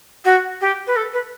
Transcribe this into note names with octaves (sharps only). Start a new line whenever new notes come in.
F#4
G4
B4
A4
B4